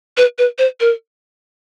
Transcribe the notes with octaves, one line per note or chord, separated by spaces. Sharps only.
B4
B4
C5
A#4